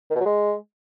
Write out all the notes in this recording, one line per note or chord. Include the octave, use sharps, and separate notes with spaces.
D#3
B2
F#3
G#3